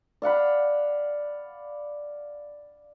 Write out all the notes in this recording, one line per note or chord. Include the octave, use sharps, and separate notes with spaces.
D5 F5 F#5 B5